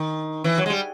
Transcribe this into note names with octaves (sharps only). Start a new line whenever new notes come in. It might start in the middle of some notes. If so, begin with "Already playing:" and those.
Already playing: D#3
E3
F#3
G#3
G3